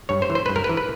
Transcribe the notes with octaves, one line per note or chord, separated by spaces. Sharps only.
G2 C#5
C5
E3
C5
G2 B4
A#4
B4
E3
B4